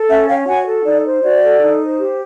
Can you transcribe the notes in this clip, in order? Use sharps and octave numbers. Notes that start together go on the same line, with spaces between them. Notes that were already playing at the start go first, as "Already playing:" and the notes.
Already playing: A4
C#4 E5 F#5
C#5 F5 G5
F#4 F#5 G#5
A4
D#4 D5
C5
F#4 D5
A4
D#4
C5
G4